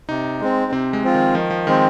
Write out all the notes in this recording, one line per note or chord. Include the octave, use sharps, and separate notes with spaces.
C3 D#4
G#3 C4
C3 C4
G#3
F3 C4 F4
D#3
D#3 F3
F3
D#3 G#3 C4